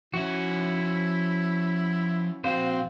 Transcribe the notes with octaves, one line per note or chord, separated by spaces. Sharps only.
F3 C#4 E4 F#4 E5
A#2 F3 C4 F#4 C5 F5